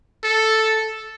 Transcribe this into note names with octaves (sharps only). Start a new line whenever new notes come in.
A4